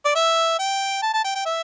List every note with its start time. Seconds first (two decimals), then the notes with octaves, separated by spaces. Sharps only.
0.05 D5
0.15 E5
0.59 G5
1.02 A5
1.14 A5
1.24 G5
1.35 G5
1.46 E5